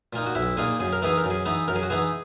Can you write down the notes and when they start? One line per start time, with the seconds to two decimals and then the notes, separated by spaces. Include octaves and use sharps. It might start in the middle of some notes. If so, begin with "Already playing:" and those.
0.13 A#2 A#3 D#4
0.26 F#4
0.35 B1 E4
0.57 A#2 A#3 D#4 G#4
0.80 F#2 G#4
0.93 A#4
1.02 E3 B3 D#4 G#4
1.18 A#4
1.24 F#2
1.30 G#4
1.46 E3 B3 D#4
1.68 F#2 A#4
1.76 G#4
1.83 F#4
1.90 E3 B3 D#4 G#4